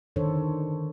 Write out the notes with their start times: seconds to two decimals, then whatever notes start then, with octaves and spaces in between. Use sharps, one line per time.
0.16 D3 D#3 D4 A4 C5 C#5